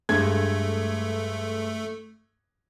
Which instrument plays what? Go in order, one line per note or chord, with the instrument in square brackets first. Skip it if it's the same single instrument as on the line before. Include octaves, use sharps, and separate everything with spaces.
[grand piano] G2 G#3 G#6 [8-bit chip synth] A3